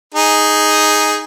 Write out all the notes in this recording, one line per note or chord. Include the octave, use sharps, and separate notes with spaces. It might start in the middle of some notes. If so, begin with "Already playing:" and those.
D#4 G#4